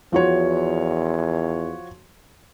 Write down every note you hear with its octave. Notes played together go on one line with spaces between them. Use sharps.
E2 F3 F#4 C#5